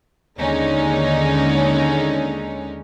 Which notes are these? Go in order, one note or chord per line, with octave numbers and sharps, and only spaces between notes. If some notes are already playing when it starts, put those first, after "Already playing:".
D#2 D3 G#3 C#4 D#4